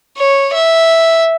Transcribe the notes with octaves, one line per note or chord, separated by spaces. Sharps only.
C#5
E5